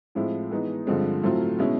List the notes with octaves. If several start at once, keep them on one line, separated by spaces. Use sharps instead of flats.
A2 F3 G#3 C4 E4
E3 G#3 B3 D#4
G2 D3 F3 G#3 C4
A2 F#3 A3 C4 F4
B2 G#3 C#4 E4